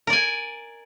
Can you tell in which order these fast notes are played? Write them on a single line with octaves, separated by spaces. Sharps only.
A#4 D5 G#5